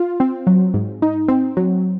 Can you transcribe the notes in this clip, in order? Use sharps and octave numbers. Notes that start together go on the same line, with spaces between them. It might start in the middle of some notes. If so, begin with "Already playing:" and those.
Already playing: F4
C4
F#3
G#2
D#4
C4
F#3